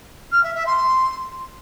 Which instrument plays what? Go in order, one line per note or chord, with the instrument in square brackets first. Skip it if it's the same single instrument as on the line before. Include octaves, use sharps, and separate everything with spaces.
[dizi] F6
E5
E5
C6